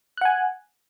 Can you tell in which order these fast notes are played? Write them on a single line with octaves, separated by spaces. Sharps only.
F#6 F#5 G#5